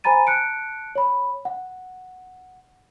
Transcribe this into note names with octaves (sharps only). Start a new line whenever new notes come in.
C5 G#5 A#5 B5 A6 D#7
A5 F#6 C#7 D7
C#5 B5
F#5